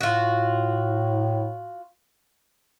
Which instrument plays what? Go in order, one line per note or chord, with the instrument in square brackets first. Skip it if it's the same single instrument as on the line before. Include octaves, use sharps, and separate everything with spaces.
[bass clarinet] A2 [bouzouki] F4 F#4